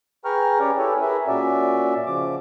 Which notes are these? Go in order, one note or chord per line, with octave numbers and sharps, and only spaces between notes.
G#4 B4 G5 A#5 C#6 F6
C#4 G4 B4 C#5 D5
E4 G4 A4 B4 C#5 G#5
G#4 A#4 B4 E5
A#2 C#4 F#4 D5 E5
C#3 F3 D6